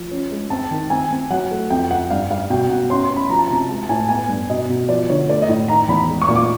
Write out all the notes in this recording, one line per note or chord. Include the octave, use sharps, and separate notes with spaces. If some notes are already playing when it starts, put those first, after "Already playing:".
Already playing: F3
C#4
G#3
C4 A5
D#3
C4 G#5
C4
F#3 F#5
A3
F2 G5
F2 F#5
G2 F5
G3 F5
B2 G5
B2 F#5
C#4 C6
C6
C#4
B5
F3 A#5
A5
C3 A#5
G#3 A5
A5
A2 G#5
B3 G#5
G2
B2 D#5
B2
F3 D5
D3 C#5
A3 D5
D#5
A2
D#3 A#5
E2 B5
G#3
C#6
A#2
D6